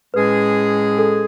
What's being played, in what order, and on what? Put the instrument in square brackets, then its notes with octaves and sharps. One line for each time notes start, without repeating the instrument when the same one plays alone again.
[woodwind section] A2 G#3 C#4 G#4 [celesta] B4
[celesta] A4